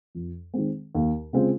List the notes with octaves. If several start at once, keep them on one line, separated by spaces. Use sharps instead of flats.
F2
D#3 G#3 C4
D#2
C#3 G#3 C4 F4